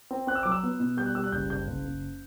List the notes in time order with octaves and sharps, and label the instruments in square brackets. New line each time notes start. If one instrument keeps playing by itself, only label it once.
[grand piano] C4
C4 F#6
E6
F#3 D6
E6
B3
B2
G3 G6
F#6
G3 E6
F#6
F#1 G6
F#1 G6
F#1
F#1